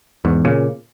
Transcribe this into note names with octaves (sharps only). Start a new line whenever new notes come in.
E2 G#2
A#2 C#3